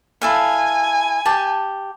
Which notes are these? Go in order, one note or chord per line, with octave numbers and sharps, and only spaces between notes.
E4 A4 F5 G#5
G4 A5